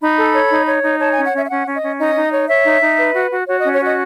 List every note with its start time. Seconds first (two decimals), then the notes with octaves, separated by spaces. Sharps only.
0.01 D#4 B5
0.17 A4
0.33 C#5
0.50 D#4
0.66 C#5
0.84 D#4
1.00 C#5 A5
1.12 G#5
1.17 C#4
1.25 F#5
1.33 C#4 E5
1.45 E5
1.49 C#4 F#5
1.66 C#4
1.74 D#5
1.82 C#4
1.99 D#4 D#5
2.16 D#4
2.32 C#5
2.49 C#5 E5
2.65 D#4
2.82 D#4
2.98 B4
3.15 F#4
3.31 F#4
3.48 F#4 C#5
3.60 D#5
3.65 C#4
3.73 C#5
3.81 F#4 D#5